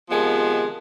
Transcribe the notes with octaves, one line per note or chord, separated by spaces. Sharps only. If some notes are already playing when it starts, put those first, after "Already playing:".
C3 D#3 F3 G#3 B3